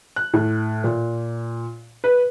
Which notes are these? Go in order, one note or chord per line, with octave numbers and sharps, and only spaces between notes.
F#6
A2
A#2
B4